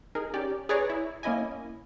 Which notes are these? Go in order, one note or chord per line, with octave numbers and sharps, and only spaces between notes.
D#4 G#4 A#4
C#4 G4 D5
G#4 B4 C#5 D5 A#5 C#6
E4
A#3 C#4 E4 D#5 G#5